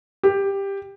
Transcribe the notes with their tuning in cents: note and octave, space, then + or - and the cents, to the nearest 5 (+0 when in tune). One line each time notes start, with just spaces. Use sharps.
G4 +10